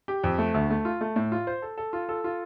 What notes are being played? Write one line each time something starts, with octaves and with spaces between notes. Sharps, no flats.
G4
F2
A3
D2
A3
F4
A3
A2
F4
C5
A4
A4
F4
A4
F4